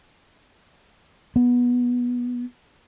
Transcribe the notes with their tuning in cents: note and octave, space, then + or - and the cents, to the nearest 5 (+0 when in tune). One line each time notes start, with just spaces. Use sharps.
B3 -15